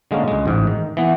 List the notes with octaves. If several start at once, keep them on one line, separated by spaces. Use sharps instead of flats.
D3 G#3 A#3 C#4
C#2 G#3
A1 G#2
D#3
E3 B3